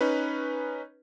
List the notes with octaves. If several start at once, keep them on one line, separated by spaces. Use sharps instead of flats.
C#4 D#4 B4